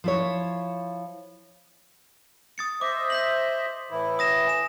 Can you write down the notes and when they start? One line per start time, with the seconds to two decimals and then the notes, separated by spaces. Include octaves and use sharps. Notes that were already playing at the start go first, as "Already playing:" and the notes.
0.04 F3 E4 C#5
2.58 D#6 A6 C#7
2.81 C5 D#5 E5 D6
3.10 G6 B6 F#7
3.91 A2 E3 E4
4.19 D#6 A#6 E7
4.47 G#5 E7